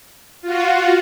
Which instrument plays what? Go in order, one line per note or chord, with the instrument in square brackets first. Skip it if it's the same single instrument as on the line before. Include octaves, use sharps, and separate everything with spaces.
[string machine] F4 F#4